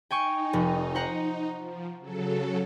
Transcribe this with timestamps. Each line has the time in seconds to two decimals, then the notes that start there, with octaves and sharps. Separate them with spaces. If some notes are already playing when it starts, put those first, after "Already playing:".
0.11 D#4 G5 G#5 C#6
0.53 F1
0.95 C5 F#5 A#5
1.56 F3
1.99 C#3 F#3 A4